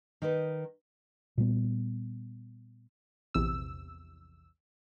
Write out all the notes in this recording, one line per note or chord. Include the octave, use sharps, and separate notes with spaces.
D#3 D#4 B4
A#2 G3 B3
A#1 E2 C3 E6